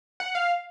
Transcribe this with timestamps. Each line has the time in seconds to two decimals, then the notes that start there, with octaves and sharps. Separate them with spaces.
0.20 F#5
0.35 F5